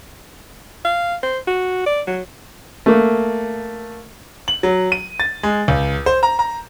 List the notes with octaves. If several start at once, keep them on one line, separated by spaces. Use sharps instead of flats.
F5
C5
F#4
D5
F#3
A3 A#3
F#7
F#3
D#7
A6
G#3
C#2
C5
A#5
A#5